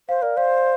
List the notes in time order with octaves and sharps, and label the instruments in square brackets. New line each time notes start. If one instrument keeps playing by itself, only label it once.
[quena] C5 [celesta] F5
[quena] A#4 [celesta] D5
[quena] C5 [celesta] F5